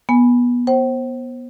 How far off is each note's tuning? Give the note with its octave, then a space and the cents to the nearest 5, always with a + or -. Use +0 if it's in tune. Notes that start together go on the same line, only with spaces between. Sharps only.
B3 -20 G#5 +0
C5 +25 G5 -45